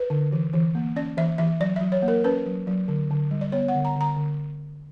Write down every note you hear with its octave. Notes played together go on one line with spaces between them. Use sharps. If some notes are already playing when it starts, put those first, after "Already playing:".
Already playing: B4
D3
E3
E3
A#3
C#4 D5
E3 E5
E3 E5
F#3 D5
F#3 E5
C#5
A#3
A#4
C#4 B4
F#3
F#3
D3
D3
G3
D5
B3 C#5
F#5
D3
A#5
D3 A#5
D3